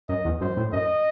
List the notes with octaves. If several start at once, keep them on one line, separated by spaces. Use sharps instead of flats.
F#2 D#5
E2
F#2 C5
A2
F#2 D#5